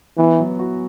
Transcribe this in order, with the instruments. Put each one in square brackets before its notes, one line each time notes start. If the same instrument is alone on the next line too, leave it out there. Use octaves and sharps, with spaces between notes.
[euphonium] E3 [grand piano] B3
[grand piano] F#3
F#4